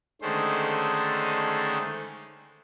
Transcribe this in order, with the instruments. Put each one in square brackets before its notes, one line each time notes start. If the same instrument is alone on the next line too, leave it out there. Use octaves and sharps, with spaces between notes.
[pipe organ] D3 D#3 G#3 A3 C#4 C5